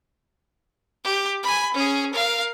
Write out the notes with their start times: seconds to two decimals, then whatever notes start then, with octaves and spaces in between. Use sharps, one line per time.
1.04 G4
1.43 G#5 B5
1.74 C#4 G#4
2.13 A#4 F5